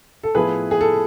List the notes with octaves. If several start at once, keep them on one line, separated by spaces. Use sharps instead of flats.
A4
A2 F3 B3 E4 G#4 B4
G#4
A4